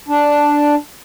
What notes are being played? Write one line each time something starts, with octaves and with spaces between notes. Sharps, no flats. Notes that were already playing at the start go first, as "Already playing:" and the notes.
D4